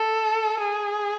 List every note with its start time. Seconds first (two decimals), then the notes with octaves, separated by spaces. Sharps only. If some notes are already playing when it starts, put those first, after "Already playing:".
Already playing: A4
0.60 G#4